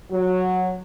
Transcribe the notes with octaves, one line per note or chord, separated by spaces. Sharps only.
F#3